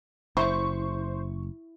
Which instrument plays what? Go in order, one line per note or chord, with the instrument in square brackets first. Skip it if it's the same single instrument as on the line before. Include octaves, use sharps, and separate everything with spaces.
[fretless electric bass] F#1 [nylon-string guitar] E4 [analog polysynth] C5 [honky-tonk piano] C#6